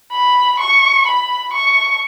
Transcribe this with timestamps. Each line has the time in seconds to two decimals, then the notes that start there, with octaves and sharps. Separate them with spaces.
0.12 B5
0.59 C#6
1.07 B5
1.53 C#6